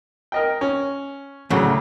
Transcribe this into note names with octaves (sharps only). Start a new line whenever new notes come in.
A#4 D#5 G5
C#4
D2 A2 C#3 F#3 A3